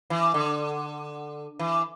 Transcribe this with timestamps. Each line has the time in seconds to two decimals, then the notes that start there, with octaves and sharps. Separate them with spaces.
0.10 E3
0.34 D3
1.59 E3